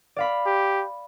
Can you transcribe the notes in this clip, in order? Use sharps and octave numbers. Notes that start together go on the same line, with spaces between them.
D5 F5 B5
G4